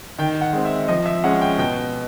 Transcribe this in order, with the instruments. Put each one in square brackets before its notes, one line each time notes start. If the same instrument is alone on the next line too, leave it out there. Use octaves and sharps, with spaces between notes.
[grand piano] D#3 G5
F#5
G#3 C4
E5
F3 D#5
E5
G#3 C#4 F#5
G5
B2 G5